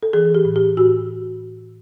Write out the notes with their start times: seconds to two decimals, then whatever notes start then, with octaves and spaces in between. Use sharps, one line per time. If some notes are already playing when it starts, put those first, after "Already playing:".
0.03 A4
0.13 E3 G#4
0.35 G4
0.45 A2
0.56 G4
0.77 A2 F#4